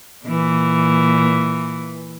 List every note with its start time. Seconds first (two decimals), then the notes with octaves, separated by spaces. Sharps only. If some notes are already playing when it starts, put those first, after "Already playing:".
0.25 A#2 E3